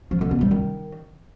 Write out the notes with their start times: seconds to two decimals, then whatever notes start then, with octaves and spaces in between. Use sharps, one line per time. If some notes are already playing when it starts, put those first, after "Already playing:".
0.11 F3
0.21 D3
0.31 B3
0.41 G3
0.51 D#3